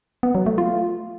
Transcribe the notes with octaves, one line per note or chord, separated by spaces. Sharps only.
B3
F#3
A3
F4